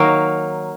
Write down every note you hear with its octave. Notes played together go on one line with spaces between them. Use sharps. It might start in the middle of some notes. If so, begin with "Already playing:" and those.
Already playing: D#3 F#3 A#3